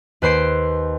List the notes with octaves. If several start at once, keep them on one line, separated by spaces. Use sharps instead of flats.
D#2 B4 C5 C6 C7 D7